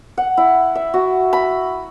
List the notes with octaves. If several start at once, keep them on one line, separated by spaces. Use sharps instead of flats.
F#5
E4
E5
F#4
B5